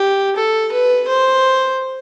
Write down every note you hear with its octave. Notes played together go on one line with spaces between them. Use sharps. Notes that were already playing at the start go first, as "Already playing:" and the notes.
Already playing: G4
A4
B4
C5